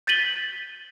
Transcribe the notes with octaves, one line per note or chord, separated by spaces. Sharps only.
G6 A6 B6 D#7 F#7 G7